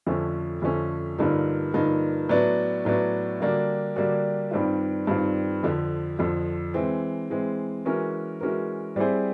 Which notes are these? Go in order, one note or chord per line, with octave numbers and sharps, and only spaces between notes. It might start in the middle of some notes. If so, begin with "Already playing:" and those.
F2 D3 F3 A3 C#4
F2 D3 F3 A3 C#4
G2 D3 F3 A#3 D#4
G2 D3 F3 A#3 D#4
A2 F#3 B3 D4
A2 F#3 B3 D4
D3 G3 A#3 D4 F#4
D3 G3 A#3 D4 F#4
G2 D#3 G3 C4 F4
G2 D#3 G3 C4 F4
F2 D3 F3
F2 D3 F3
E3 G#3 C4
E3 G#3 C4
E3 G#3 C#4 F#4 A#4
E3 G#3 C#4 F#4 A#4
G3 C4 E4 G#4 C5